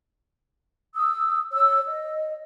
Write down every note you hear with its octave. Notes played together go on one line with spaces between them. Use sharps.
D#6 E6
C#5 E6
D#5